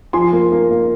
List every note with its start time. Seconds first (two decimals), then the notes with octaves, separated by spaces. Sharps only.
0.13 F3 G#5 C6
0.33 A#3
0.52 A#3
0.71 A#3